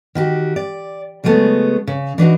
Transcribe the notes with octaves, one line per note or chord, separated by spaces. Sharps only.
D#3 F#4 G4
D5
C#3 F#3 G#3 A3 B3
C#3
E3 D4 D#4 F#4